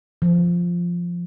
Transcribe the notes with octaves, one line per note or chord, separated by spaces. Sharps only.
F3